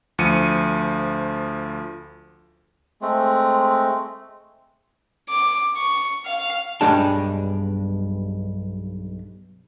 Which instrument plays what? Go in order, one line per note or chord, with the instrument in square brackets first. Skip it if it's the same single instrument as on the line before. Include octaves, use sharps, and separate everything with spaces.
[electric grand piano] D2 F3 C#7 D#7
[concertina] G#3 A3 C4
[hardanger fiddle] D6
C#6
F5
[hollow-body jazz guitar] B1 G2 G3 G#3 D4 A5